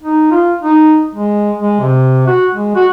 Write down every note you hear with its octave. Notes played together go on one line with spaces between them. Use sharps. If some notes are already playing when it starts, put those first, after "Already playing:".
D#4
F4
D#4
G#3
G#3
C3
F#4
G#3
F#4